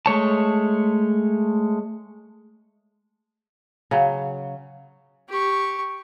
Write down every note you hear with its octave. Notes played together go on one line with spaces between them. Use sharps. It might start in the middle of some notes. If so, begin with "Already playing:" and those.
G#3 A3 C#5 A5
C#3 F#3
G4 C#6